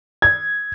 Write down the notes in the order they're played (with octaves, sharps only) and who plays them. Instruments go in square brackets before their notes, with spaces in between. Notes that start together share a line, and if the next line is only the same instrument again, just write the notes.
[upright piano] G#6